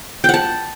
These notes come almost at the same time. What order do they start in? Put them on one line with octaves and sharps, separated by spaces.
G5 F#5 A5